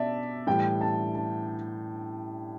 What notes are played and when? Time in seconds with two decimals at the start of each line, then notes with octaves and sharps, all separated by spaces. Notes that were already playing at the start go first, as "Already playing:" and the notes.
Already playing: B2 D5 E5 A5
0.47 A2 E3 G3 G5
0.81 A5
1.15 A5